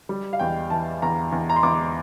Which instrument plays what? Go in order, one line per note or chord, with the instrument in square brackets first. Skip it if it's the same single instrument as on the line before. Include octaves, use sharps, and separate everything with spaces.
[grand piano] G3
F5
E2 G5
E3 A5
E2 A#5
E2
A#5
C6
E2 D6